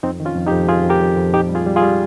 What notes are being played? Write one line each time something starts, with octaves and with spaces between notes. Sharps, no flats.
F2 C4 D#4
D#3
C#4 F4
F2
D#4 G4
F2
F2 F4 G#4
F2
G4 A#4
F2
F2
A#2 D#4 G4
G3
F4 G#4
G3
F4 G#4
G3